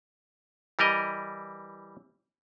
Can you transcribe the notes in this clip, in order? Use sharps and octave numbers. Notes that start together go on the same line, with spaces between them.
E3 G3 A#4 D#5